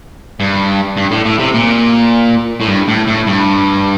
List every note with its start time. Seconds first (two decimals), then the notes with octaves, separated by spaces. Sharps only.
0.40 G2
0.97 G2
1.11 A2
1.25 A2
1.39 C3
1.54 A#2
2.61 A2
2.68 G2
2.88 A2
3.07 A2
3.27 G2